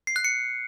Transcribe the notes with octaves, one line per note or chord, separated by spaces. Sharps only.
C7
F#6
C#7